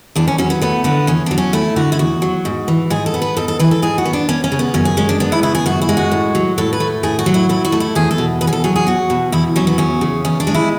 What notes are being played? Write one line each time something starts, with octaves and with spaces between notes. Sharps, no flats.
E2 D4
C#4
F#3 C#4
B3
A3 B3
D3 B3
E2 C#4
F#3 D4
C#4
A3 E4
D3 F#4
E4
E2 F#4
F#3
G#2
E3
G#2 G#4
A4
B3
B4
G#2 A4
A4
E3 B4
A4
G#2 G#4
F#4
B3
D4
B3 C#4
C#4
C#3
B3
F#2 C#4
G#4
G#3 C#4
D4
B3 D4
E4
C#3 E4
G#4
F#2 F#4
E4
G#3
F#4
A2
F#3
A2 A4
B4
A3
A2 G#4
F#4
F#3
E4
A2 E4
F#4
A3
E4
E2 G#4
A4
B2
E2 B4
G#4
A4
F#3 G#4
G#4
E2 F#4
B2
E2 E4
F#3 C#4
B3
E2 C#4
C#3
E2 C#4
D4
G#3
E4